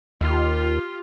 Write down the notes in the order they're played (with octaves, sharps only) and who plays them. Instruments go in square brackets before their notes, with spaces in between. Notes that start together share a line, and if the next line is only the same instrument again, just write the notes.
[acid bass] D#2 [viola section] F4 G4